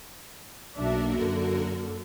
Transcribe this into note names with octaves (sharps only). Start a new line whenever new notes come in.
B1 A#3 D4 F#4 A#4 E5
F#2 D3